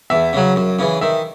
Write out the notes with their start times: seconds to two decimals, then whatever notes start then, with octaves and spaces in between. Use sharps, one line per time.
0.10 E2 E5
0.33 C#3 F#3
0.56 F#2
0.79 C#3 E3
1.01 D#3 E5